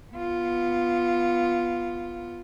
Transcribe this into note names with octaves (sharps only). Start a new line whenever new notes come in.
B3 F4